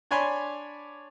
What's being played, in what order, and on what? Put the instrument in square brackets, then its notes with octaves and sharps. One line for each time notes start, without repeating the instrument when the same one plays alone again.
[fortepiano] D4 C#5 D5 G#5 B5 C6